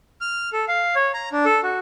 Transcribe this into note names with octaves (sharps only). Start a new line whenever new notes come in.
F6
A4
F5
C#5
A#5
D4
A4
F#4